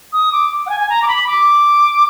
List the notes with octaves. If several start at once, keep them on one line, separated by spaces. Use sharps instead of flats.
D#6
D6
F#5
G#5
G#5
A#5
D6
B5
D6